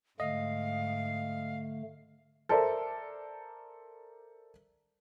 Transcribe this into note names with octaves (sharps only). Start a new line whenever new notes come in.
G#2 D3 A3 D#5 F5
A4 A#4 C5 D5 E5